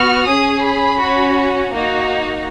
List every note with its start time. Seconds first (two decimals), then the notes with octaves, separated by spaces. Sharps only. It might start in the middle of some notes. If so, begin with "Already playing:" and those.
Already playing: B3 F#4 F6
0.27 C#4 G#4 D#6
0.64 B5
0.99 C#4 F#4
1.71 A#3 D#4 F#4